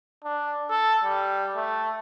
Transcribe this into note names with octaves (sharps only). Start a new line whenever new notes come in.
D4
A4
G3
A3